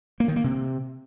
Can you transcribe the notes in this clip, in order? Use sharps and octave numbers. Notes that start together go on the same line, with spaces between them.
A#3
D#3
A#3
C3